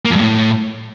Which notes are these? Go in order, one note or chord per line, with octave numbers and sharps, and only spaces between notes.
A#3
F2
G2
A2